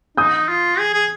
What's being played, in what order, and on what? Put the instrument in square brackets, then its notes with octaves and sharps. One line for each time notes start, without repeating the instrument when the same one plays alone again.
[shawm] D#4 [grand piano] D#6 G6
[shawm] F4
G#4
G#4